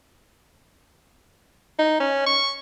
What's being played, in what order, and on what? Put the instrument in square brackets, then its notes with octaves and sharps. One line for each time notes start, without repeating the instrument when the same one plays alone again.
[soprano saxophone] D#4
C#4
C#6